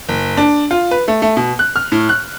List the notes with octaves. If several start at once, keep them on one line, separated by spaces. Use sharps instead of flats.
F#1
D4
F4
B4
A3
A3
B2
F#6
F6
A2
F#6